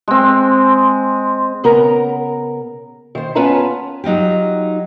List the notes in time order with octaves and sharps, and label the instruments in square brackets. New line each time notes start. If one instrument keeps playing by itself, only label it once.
[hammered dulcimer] G#3 C4
[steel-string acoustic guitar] C#3 B3 A#4 A#5
D#3 C5
B3 C#4 F4 B4 A5 A#5
[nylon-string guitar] F#3 D#4 F4 G4